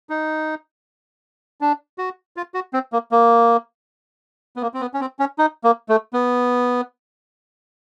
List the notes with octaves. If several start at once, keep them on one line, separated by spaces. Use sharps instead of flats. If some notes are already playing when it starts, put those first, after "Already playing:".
D#4
D4
F#4
F4
F#4
C4
A#3
A#3
B3
A#3
C4
B3
C#4
C4
C#4
D#4
A#3
A3
B3